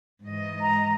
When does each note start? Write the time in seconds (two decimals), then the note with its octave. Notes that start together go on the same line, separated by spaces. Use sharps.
0.23 G#2 E3 D#5
0.61 A#5